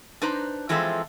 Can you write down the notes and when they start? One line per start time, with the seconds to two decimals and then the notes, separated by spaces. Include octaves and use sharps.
0.22 D4 D#4 B4 C5 A#5
0.69 E3 F3 G#3 C4 A4 E5